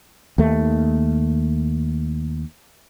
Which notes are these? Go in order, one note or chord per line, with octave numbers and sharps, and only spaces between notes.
D#2 A3